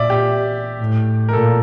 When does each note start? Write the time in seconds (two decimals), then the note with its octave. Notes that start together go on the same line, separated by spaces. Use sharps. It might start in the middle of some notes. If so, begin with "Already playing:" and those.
Already playing: A#2 D5 E5
0.10 G4
0.79 A2
1.29 A#4
1.33 A#2 A4